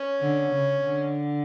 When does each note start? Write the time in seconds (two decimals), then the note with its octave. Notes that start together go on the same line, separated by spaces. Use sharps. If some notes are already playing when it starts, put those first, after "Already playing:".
Already playing: C#4
0.21 D3
0.52 C#3
0.83 D3